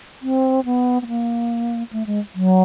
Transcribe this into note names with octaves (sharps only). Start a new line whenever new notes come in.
C4
B3
B3
A#3
A3
G#3
F#3